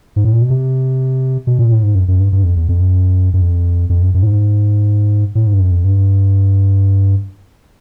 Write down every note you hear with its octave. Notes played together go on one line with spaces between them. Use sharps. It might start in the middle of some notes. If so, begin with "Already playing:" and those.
G#2
A2
A#2
B2
C3
B2
A#2
A2
G#2
F#2
F#2
G2
G2
F2
E2
F2
F#2
F#2
F2
F2
F#2
F#2
A2
G#2
A2
G#2
G2
F#2
F2
G2